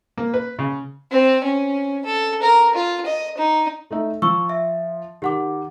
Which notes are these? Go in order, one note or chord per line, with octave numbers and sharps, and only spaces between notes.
A#3
B4
C#3
C4
C#4
A4
A#4
F4
D#5
D#4
A3 D#4 E5
F3 C#6 E6
E5
D#3 G4 F#5 D6